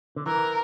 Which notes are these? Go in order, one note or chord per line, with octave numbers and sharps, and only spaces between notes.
D3
E3 A#4